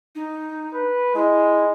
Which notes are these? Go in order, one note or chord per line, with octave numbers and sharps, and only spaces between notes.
D#4
B4
G#3 E4